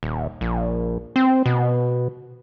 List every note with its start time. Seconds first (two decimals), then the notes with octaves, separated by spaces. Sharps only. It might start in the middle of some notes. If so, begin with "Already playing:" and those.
0.03 D#1
0.41 A#1
1.16 C4
1.46 B2